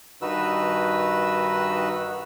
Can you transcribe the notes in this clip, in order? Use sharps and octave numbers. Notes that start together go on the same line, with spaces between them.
G2 D#3 D#4 F#4 B4 E6